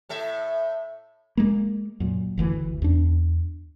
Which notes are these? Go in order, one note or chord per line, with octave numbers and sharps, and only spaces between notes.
A2 A4 E5
G#3 A#3
F#2 A#2
F#1 D2 E3
E2 D4